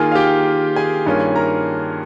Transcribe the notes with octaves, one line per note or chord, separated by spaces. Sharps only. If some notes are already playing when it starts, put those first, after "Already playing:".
Already playing: D#3 A#3 F4 G#4 G#5
F5
G4 G5
G#4 G#5
G2 D#3 A#3 C#4 F4
A#4 A#5